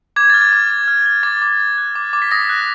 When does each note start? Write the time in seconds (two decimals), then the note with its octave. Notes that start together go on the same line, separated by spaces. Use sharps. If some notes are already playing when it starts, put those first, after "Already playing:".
0.16 D6 G#6
0.30 F6 A6
0.41 G#6
0.53 D6
0.70 D6
0.88 F6
1.06 F6
1.23 D6 A6
1.42 D6
1.60 D6
1.78 F#6
1.95 D6
2.13 D6
2.22 B6
2.31 D#6 A#6
2.49 F#6